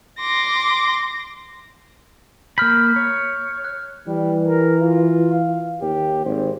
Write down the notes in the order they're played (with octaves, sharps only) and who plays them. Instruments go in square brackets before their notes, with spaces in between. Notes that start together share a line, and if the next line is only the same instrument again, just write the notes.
[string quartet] C6 D6 A#6
[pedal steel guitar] A#3 B5 [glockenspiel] F6 G6
[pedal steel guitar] C#5
[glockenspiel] F#6
[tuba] E3 [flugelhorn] G3
[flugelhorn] A#4
F4
F5
[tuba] D#2 [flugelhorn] G4
[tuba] G#1 [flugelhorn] C5